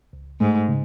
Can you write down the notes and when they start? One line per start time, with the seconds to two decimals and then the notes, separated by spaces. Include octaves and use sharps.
0.13 C#2
0.41 G#2 A3
0.68 C#3